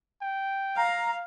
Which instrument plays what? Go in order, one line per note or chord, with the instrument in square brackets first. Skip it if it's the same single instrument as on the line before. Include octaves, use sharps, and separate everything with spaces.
[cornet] G5
[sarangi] F5 [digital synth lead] A#5